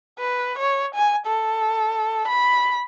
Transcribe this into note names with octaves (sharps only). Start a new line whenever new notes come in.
B4
C#5
G#5
A4
B5